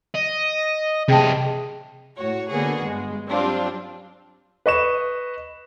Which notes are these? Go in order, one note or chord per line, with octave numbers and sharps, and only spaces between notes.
D#5
C3 G#4 D#5 G5 A5
A2 F#4 C#5
D3 A#3 B3 F#4 G#4
G2 G#3
F#3 G3 C4 D4 F4
B4 D#5 C#6 E7